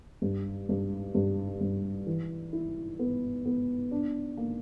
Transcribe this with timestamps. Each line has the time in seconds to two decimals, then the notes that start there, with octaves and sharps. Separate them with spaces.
0.22 G2
0.69 G2
1.15 G2
1.61 G2
2.07 E3
2.53 E4
2.99 B3
3.46 B3
3.91 D4
4.37 A#3